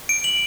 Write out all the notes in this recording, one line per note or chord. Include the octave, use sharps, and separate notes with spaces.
D7
F#7